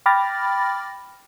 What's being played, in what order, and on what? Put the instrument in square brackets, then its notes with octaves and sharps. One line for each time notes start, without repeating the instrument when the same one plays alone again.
[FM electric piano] G5 B5 D6 F6 A6 A#6